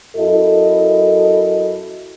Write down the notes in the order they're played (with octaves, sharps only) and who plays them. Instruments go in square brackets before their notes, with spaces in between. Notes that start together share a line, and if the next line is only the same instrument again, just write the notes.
[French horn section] F#2 E4 F#4 A4 D#5